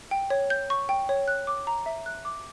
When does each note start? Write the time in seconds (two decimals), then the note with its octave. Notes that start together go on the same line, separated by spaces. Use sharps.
0.11 G5
0.30 C#5
0.50 G6
0.70 C#6
0.89 G5
1.09 C#5
1.28 F#6
1.47 D6
1.67 A#5
1.86 E5
2.06 F#6
2.25 D6